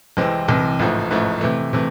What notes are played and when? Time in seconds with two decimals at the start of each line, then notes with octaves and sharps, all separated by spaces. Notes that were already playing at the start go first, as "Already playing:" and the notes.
0.17 C2 C3 E3 G#3 C4
0.48 C2 C3 E3 G#3 C4
0.79 A1 G#2 F3 A3
1.11 A1 G#2 F3 A3
1.41 C3 E3 A3
1.73 C3 E3 A3